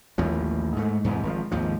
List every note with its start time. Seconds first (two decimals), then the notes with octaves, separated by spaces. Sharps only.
0.18 A1 D#2 A2 F3
0.77 G#2 A3
1.04 E2 G#2 C3 E3
1.23 G#1 D3 F3
1.51 G#1 D#2 F3